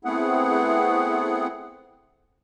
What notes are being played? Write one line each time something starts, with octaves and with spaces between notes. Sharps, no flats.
A3 B3 C4 E4 G#4 F#5